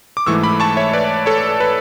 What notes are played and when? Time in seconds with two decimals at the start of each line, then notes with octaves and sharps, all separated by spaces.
0.17 D6
0.26 G#2 E3 A3 C#6 E6
0.43 B5 D6
0.60 A5 C#6
0.76 C#5 E5
0.93 B4 D5
1.26 A4 C#5
1.60 B4